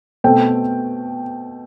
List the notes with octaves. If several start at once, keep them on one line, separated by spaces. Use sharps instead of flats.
B2 A3 C4 G5